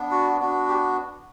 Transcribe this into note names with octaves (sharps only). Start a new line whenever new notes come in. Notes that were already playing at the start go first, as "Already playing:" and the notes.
Already playing: B3 D4
F#4
B3 D4 F#4
G4